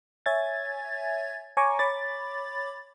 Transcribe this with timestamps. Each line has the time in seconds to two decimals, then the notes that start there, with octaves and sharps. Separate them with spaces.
0.26 C#5 E5 G#5 G#6 A6
1.57 C#5 G#5 A#5 C#6 D6
1.79 C#5 B5 D6 A6